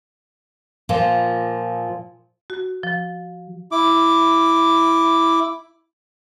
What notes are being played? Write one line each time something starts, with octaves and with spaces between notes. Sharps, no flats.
A#2 F3 A#3
F#4
F3
E4 D6